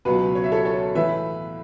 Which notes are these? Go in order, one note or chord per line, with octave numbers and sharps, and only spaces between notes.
C#2 B2 F#3 F#4 B4
C#5
E5
A4 C#5
A4 C#5
A2 E3 B4 E5